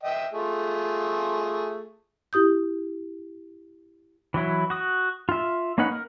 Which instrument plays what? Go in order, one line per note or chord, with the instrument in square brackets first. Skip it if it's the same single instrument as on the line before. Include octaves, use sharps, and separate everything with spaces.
[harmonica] D#5 E5 G5
A3 F4 G#4
[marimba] E4 G4 D#6 G6
[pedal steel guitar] E3 F#3 E4
F#4 D#6
F4 E5
A#3 C#4 D#4 B4 F#5
A#4